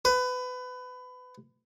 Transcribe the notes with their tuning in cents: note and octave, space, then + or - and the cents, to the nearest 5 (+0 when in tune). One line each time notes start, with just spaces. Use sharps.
B4 +25